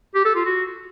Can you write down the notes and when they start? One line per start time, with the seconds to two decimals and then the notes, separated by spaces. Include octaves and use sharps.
0.15 G4
0.25 A4
0.35 F4
0.45 F#4